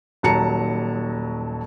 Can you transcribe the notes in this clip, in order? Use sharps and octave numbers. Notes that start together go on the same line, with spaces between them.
D#1 D#2 F#3 A5 A#5 C#7